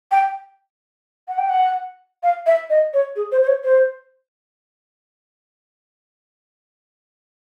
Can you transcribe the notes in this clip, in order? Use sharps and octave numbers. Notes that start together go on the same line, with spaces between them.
G5
F#5
G5
F#5
F5
E5
D#5
C#5
G#4
C5
C5
C#5
C5